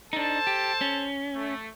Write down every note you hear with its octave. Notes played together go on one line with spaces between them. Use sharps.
D4 D#4 A4 C5 A5
G4
C#4
A3